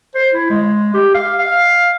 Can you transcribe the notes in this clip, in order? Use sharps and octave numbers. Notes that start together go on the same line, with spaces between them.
C5
E4
G#3
G4
F5
F5